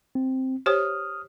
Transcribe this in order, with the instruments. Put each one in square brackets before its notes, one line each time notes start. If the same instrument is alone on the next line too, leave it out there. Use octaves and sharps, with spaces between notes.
[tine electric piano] C4
[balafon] G4 C5 C#5 [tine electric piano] D#6 F6